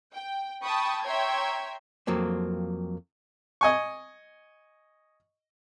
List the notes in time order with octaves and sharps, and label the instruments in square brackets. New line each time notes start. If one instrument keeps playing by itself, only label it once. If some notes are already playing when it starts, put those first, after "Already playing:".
[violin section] G5
G5 A5 B5 C#6 D#6
C#5 E5 G5 A#5 C6 G#6
[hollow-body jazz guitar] F2 F#3 A#3 C4
[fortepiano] D#5 G#5 C#6